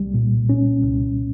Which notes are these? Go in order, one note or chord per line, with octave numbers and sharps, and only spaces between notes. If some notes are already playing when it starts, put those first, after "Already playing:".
Already playing: C2 G3
A#2
C#4
C2